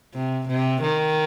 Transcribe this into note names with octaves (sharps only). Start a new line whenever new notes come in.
C3
C3
D#3